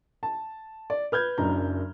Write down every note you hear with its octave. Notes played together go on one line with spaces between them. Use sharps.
A5
D5
B4 F6 G6 G#6
F#1 F#2 D4 A#5